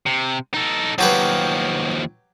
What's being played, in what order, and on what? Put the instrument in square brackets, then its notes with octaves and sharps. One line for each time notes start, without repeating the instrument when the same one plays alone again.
[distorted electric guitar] C3
D#4 A4
[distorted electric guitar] D#2 F3 [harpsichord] F#3 G4 B4